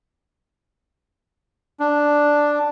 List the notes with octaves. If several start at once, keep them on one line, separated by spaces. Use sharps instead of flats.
D4